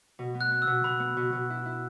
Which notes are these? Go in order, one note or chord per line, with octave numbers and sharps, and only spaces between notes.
B2
B3
F#6
B3
E6
B2
B2 B5
B3
B2
B2
E4
E4